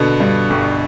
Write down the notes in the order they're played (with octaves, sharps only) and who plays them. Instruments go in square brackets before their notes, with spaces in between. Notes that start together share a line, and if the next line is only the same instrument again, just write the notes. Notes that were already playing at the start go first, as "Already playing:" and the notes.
Already playing: [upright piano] B2 B3 [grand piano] D3
[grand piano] G2
G1